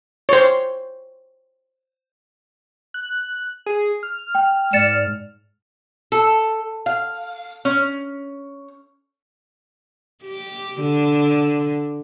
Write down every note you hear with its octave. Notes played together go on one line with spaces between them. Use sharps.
C5 C#5
F#6
G#4
F6
G5
G#2 D5 A6 C#7 E7
A4
F5
C#4
G4
D3